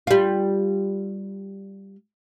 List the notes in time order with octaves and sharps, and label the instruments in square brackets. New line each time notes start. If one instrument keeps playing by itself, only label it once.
[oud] G3 F4